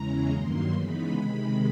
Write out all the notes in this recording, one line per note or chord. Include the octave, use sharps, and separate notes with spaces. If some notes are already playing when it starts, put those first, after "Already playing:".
Already playing: E2 C#3 E3 G#3 C#4 A#5
G2 D#3 F#3 A#3 C6
C#3 E3 G#3 B3 D#4 B5
C3 D#3 G#3